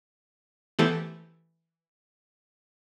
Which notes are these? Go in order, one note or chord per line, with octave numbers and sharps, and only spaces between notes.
E3 A3 B3 G4 A4 C5